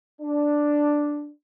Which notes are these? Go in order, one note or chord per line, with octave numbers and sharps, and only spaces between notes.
D4